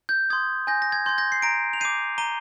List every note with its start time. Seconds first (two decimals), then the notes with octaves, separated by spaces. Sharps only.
0.09 G6
0.30 C6 D#6 G#6
0.67 G#5 G6 A#6
0.82 A#6
0.92 G#6
1.06 C6 G6 G#6
1.18 G6 A#6
1.32 C7
1.42 A#5 A#6 D7
1.73 F7
1.80 D6 G6 C7 D#7
2.18 A#5 D#7 G7